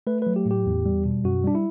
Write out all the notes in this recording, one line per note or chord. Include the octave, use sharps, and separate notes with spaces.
A3 B4
F#3 B4
G4
A2
G4
E2
G3
B2
F#2 F#4
G3 D4
E4